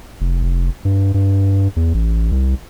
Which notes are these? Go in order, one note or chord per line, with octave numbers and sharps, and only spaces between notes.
F1
F1
G2
G2
E2
A1
C2